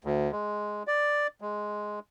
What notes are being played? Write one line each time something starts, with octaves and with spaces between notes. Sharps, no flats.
D2
G#3
D5
G#3